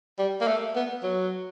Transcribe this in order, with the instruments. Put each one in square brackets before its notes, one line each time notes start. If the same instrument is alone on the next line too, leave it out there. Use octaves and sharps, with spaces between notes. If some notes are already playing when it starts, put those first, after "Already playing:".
[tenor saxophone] G3
A#3
A3
B3
F#3